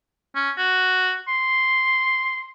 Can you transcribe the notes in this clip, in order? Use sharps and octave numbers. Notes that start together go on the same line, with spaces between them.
C#4
F#4
C6